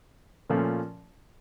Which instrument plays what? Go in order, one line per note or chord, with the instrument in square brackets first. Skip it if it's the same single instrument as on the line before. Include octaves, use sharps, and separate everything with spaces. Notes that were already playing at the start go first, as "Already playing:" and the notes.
[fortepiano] A#2 F3 A3 C#4